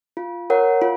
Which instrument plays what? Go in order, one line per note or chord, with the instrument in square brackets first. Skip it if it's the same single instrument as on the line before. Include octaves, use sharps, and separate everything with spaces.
[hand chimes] F4
A#4 C#5 F#5
F4